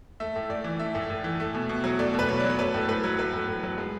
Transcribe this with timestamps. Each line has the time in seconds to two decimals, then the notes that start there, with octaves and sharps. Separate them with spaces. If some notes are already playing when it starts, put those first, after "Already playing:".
0.20 A3 E5
0.36 A2
0.50 A2 D5
0.64 E3
0.79 A3 E5
0.95 A2
1.10 A2
1.24 E3
1.40 A3
1.54 B2
1.69 B2
1.84 F#3
1.99 A3 D5
2.14 B2
2.19 B4
2.29 B2 C#5
2.40 F#3 D5
2.50 C#5
2.59 A3 B4
2.74 A2
2.88 A2 B4
3.04 F#3
3.19 A3 B4
3.33 A2
3.48 A2
3.63 F#3
3.78 G#3